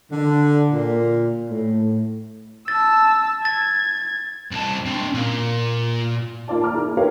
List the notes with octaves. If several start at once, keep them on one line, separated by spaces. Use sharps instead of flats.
D3
A#2
A2
A5 E6 A6
G#6 A6
C2 A5
C4 D4
A#2
A#3 F4 D5 A5
A5 A#5 D6 F6
A#3 E4 G#4
G4 A#4 B4 C#5 F5